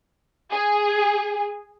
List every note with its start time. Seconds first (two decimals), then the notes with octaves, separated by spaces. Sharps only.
0.51 G#4